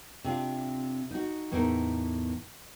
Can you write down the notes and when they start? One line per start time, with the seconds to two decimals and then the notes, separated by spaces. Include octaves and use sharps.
0.24 C3 D4 F4
1.11 D#4 F#4
1.51 E2 A2 B3 D#4 E4 A#4